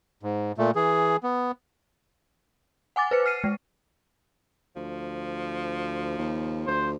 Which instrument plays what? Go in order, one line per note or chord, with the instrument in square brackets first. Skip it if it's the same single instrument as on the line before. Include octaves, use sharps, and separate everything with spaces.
[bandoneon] G#2
A#2 A3
E3 G#4
B3
[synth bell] F#5 G#5 D6 A6
B4 C5 C#7
F6 C7 D#7
G#3
[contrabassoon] D2 [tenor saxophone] F3
[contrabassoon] D#2
[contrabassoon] D2 [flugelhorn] C5